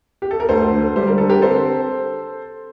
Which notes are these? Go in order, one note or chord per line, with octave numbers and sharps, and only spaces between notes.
G4
A4
A#4
D2 A4 C5
D3
G3 C5
A#4
D3 A4
G4 A#4
C4 A4 C5